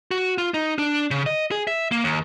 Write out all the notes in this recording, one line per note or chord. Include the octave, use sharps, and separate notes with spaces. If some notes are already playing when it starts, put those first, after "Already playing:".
F#4
F4
D#4
D4
C#3
D#5
G#4
E5
A#3
D#2